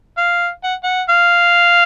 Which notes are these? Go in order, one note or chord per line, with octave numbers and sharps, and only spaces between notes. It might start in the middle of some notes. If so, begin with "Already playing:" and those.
F5
F#5
F#5
F5